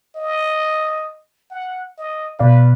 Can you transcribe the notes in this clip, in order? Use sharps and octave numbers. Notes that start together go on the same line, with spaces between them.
D#5
F#5
D#5
B2 B4 D5 F5